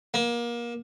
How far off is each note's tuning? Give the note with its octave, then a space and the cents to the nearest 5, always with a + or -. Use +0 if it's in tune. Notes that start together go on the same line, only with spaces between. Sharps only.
A#3 +30